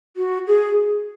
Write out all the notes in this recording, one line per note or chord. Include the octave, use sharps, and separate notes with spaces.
F#4
G#4